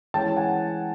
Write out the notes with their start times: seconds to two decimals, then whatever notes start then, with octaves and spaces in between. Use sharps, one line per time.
0.14 E3 G#3 C#4 G5 A5
0.36 F#5 G#5